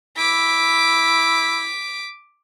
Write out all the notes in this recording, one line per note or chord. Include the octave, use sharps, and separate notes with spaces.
E4 D6 B6